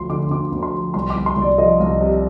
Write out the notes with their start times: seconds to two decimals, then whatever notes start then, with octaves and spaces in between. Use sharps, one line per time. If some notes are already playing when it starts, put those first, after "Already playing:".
Already playing: D2 F3 C6
0.09 D3 D6
0.31 D2 D6
0.52 D2
0.63 C6
0.73 F3
0.94 C2 C6
1.10 D6
1.15 C2
1.26 C6
1.37 C2
1.42 D5
1.58 F3 D#5
1.80 C2
2.01 C3